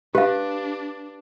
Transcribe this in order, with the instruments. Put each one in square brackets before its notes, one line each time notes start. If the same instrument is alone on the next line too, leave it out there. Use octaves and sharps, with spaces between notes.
[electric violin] D4 [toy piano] G4 F5 [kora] B4